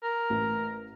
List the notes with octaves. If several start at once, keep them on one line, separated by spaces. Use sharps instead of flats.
A#4
A1